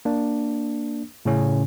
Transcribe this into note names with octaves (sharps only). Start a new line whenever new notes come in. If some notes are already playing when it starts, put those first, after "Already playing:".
A#3 D4
A2 C#3 C#4